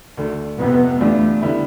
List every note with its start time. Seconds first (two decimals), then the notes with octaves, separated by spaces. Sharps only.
0.17 D2 D3 A3
0.59 F1 F2 C3 B3
1.00 E2 D3 G3 A3 D4 F4
1.42 D3 G3 B3 E4